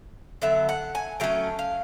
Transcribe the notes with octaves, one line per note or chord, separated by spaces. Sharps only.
D3 F#3 B3 E5
F#5
G#5
F#3 A3 C#4 G5
F5